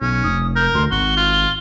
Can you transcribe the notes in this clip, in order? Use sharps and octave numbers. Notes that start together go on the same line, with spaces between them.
B1 C#4
F1 D#6
A#4 G6
D2 C6
G#1 F#4 G7
F4